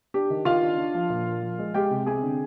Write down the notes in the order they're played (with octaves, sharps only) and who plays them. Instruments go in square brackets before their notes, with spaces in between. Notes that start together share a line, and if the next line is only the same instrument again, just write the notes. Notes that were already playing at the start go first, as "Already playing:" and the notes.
[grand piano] D4 G4
D#3
D#3 F4 F5
D4
D4
F3
A#2
A#3
F3
G#3
G#3 G4 G5
C3
C4 G#4 G#5
D3